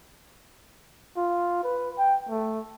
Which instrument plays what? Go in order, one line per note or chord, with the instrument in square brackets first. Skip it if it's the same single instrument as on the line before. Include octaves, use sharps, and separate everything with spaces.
[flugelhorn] F4
B4
G5
A3